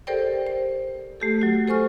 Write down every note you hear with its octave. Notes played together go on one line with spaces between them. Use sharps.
G4 A4 A#4 C5 D5 G5
C5
A3 G4 A4
F#3 F#4
A4 C5 G#5 C#6 F6